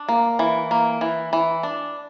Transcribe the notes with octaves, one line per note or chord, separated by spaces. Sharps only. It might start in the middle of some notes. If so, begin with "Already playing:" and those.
Already playing: D4
A#3
E3
A#3
E3
E3
D4